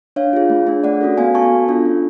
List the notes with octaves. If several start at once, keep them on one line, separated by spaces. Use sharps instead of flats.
D4 C#5 F5
F4 G#4
A3
D4 G#4
A3 D5 F#5
C#4 F#4 A4
B3 F5 G#5
F#4 A4 A5 C#6
B3
D4 F4 A4
C#4